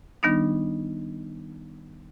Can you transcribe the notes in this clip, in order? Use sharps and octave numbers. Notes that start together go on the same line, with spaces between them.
D#3 G3 B3 D4 D#4